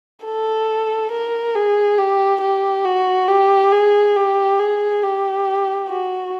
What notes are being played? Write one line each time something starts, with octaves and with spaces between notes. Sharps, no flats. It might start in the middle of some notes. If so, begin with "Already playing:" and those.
A4
A#4
G#4
G4
G4
F#4
G4
G#4
G4
G#4
G4
F#4